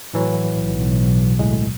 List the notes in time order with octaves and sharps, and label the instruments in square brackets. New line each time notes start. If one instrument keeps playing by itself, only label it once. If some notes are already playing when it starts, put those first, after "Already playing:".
[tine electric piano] A2 E3 F#3
[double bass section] B1
[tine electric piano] D2 A2 G#3